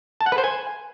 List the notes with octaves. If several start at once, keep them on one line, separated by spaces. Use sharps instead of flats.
A5
F#5
B4
C5
G#5